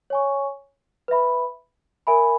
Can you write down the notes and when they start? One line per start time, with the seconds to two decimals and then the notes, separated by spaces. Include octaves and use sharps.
0.10 C#5 G#5 C#6
1.08 B4 E5 B5
2.07 A#4 E5 G#5 B5